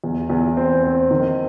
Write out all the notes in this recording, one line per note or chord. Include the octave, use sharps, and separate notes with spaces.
E2
E2
C4
C4
D#3